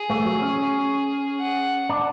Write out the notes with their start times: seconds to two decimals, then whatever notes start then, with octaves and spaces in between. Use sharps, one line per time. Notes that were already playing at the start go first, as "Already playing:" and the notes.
Already playing: G#4
0.10 A3
0.25 F#3
0.42 C#4
1.40 F#5
1.89 D4